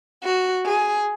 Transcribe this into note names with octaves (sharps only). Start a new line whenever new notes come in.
F#4
G#4